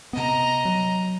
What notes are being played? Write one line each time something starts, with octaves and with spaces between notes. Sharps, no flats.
C3 B3 D#5 A#5
F#3